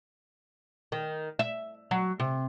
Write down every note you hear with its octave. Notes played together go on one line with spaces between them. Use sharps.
D#3
E5
F#3
C3